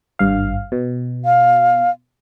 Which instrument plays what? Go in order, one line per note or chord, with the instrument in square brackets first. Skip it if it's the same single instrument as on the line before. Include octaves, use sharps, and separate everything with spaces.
[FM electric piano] G#1 G2 F5
B2
[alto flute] F5